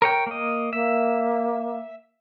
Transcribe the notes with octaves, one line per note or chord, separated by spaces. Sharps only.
A#4 C#5 G5
A#3 D#5
A#3 E5